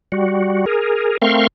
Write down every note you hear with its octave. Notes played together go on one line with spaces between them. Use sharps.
G3 F#4
G#4 A#4
A3 C4 A#4 F5 C6 C#6